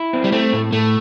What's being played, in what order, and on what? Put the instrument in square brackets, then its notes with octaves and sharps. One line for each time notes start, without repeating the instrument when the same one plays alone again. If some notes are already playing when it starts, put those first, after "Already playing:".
Already playing: [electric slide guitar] E4
C4
[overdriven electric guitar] G3
[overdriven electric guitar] A3 [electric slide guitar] C4
[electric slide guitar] A2
[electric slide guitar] A2 [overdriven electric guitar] A3